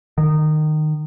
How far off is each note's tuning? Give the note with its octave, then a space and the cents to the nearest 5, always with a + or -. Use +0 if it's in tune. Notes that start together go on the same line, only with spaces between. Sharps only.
D#3 -20